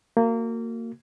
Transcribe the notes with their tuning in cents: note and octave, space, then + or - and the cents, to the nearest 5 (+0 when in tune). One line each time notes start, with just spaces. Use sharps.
A#3 -25 F#4 +0